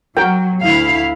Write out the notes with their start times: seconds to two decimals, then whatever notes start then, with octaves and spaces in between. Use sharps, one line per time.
0.17 F#3 F#4 A#4 G5
0.63 D2 E4 F5